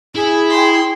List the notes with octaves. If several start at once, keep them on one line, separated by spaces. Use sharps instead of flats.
E4 G#4
C#5 G5 C6